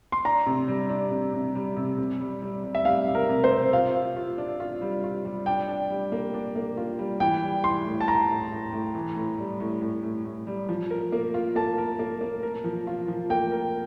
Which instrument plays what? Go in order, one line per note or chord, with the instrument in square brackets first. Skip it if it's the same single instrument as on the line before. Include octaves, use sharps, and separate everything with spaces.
[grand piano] C6
[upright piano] D4 [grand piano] A#5
[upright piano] C3
G3
D4
C3
C3
G3
C3
C3
G3
G3
G3
[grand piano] E5
[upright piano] G3 [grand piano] F5
[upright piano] C3
[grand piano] A#4
[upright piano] C3
[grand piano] C5
[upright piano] C3
[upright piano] F4 [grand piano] F5
[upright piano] F4
F4
D4
F4
G3
F4
G3
[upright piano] D4 [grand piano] G5
[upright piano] D4
G3
A#3
D4
A#3
F4
G3
[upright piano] E3 [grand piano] G5
[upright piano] G3
[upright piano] E3 [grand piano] C6
[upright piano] A2
[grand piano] A5
[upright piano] A2 [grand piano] A#5
[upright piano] A2
A2
A2
E3
A2
G3
A2
A2
A2
A2
G3
F3
A#4
A#3
F4
[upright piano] A#3 [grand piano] A5
[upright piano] A#4
A#3
A#3
A#4
F3
F4
F3
[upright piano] A#3 [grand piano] G5
[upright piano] A#4